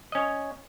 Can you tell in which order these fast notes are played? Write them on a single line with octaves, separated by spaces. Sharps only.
D#5 C#4 C#5